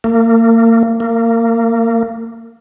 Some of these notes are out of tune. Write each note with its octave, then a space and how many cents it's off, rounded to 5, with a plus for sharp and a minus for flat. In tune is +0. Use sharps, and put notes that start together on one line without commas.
A#3 -35
A#3 -25